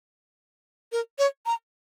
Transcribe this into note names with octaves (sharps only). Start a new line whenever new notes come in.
A#4
C#5
A#5